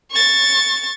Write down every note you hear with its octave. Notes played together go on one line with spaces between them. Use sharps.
C#6 A6